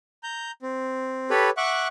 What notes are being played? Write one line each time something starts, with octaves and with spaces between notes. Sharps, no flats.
A#5 G6
C4
G4 A4 B4 C#5 B5
E5 F#5 C#6 D6 F#6